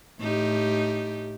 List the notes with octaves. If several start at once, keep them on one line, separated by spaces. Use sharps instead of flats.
A2 D#4 G4